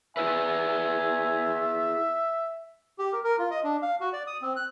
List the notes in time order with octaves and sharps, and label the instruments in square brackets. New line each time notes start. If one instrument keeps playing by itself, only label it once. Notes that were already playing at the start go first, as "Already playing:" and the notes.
[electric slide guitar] E4 G#4 B4 [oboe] E5 [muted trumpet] G#5
[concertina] G4
A#4
A#4
F4
D#5
D4
F5
F#4
D5
D#6
C4
F#6